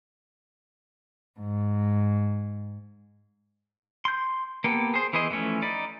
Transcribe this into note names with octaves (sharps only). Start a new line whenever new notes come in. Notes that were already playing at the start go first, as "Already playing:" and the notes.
G#2
C6 G6
A#3 B3 G4 A4
G#4 C5
E3 B3 G#4 C5 D#5
E3 F3 A3 C#4
D#4 D5 B5